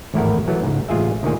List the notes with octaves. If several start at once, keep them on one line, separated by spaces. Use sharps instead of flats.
G#1 E2 A2 E4 A#4 F#5
E3 F#3 A3 B3
C#2 G#2
A1 G#3 F4 G#4 E5
D2 A#2 D#3 G#4